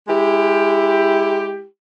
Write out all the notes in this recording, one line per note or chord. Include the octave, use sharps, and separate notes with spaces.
G#3 E4 G4